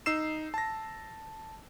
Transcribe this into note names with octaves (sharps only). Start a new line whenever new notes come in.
D#4 E6 C7 E7
A5 A#6